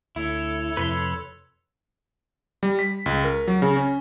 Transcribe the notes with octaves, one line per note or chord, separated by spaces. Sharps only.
D2 E4 A4 C#5
F2 C3 F3 B4 B5 C6
G3
B6
C#2
A#4
F#3
C#3
C#4